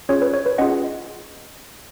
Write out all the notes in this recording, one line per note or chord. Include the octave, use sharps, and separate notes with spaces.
C#4 F4 G#4 C#5
B4
C#5
B4
C#4 F4 G#4 D#5 F#5